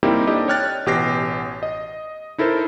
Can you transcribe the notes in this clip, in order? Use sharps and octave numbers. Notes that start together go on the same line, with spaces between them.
G3 A#3 C4 D#4 E4 G4
D4 G4 A4 D#5
C#5 G5 F6 F#6 A6
A1 B2 G4 C#5 A#6 C7
D#5
D#4 E4 A4 A#4 C5